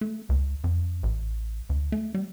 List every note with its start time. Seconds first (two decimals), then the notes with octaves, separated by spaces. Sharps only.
0.01 A3
0.29 C#2
0.64 F2
1.03 A1
1.69 D2
1.92 A3
2.14 G3